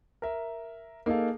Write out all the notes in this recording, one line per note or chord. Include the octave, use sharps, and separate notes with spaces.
A#4 E5
A#3 D#4 G#4 A4 F5